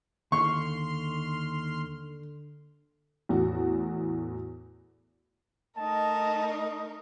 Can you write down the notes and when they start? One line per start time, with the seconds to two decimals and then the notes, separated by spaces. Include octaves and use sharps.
0.32 D#2 D3 C6 C#6 F6
3.29 E2 A2 F#4
5.77 A3 D#4 A#4 D#5 A5